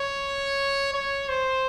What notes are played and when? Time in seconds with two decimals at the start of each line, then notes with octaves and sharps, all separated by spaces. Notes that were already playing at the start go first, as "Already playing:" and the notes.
Already playing: C#5
0.94 C#5
1.29 C5